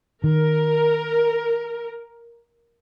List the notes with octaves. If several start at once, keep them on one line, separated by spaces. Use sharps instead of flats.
D#3 A#4